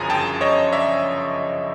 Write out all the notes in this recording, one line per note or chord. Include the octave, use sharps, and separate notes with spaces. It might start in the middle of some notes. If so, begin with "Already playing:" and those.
Already playing: G1 F#2 C#3 F3 G#5 A#5
G5 A5
C#5 D#5
D5 E5